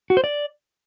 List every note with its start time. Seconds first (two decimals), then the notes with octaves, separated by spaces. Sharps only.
0.10 F#4
0.17 C5
0.24 D5